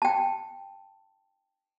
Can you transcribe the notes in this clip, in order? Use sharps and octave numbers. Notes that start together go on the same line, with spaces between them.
G5 A5